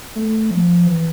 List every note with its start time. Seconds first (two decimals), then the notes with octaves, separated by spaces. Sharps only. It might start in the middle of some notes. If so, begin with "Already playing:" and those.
0.16 A3
0.51 F3
0.86 E3